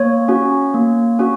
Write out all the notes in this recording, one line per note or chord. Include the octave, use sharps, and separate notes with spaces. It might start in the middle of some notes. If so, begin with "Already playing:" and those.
Already playing: A#3 C#5
C#4 F#4
A#3
C#4 F#4